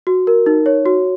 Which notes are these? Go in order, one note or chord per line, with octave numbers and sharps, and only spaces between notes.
F#4
A#4
D#4
C#5
F#4